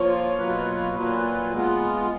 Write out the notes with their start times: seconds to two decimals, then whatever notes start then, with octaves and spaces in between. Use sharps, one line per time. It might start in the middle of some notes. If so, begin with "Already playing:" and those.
Already playing: F3 A#3 F4 C#5
0.38 B2 F#3 A#3 F4 B4
0.96 A#2 F#3 A#3 F4 B4
1.54 G#3 B3 F4